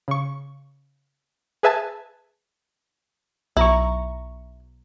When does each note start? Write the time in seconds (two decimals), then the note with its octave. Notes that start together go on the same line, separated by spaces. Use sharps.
0.08 C#3 C#6
1.63 G#4 B4 E5 G#5 A5
3.57 B1 E4 A#5 C#6